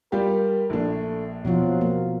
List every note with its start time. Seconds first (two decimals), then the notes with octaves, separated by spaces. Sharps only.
0.12 G3 F4 G4 A#4
0.70 A#1 A3 D4
1.45 B2 F3 F#3 F4
1.81 A#3